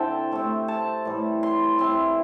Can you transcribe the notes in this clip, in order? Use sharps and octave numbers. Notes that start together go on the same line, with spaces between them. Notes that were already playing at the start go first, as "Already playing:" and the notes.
Already playing: D3 C4 E4 G5 A5
C3 A3 C4
A5
A2 E3 G3
C6
E3 C4 E4 C6